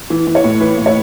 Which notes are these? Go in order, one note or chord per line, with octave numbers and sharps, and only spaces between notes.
E3
E3
C#5
A2
E3 B4
A2
C#5